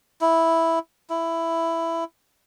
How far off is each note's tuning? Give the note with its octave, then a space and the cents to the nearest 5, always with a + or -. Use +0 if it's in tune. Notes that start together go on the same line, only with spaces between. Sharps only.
E4 -5
E4 +5